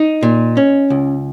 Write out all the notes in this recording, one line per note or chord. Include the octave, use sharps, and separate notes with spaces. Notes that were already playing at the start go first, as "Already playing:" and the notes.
Already playing: D#4
A#2
C#4
C#2